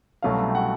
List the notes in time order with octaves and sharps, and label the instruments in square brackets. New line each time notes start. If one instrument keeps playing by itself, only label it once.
[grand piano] C2 B2 F#3 A3 C#4 F5
G5
F#5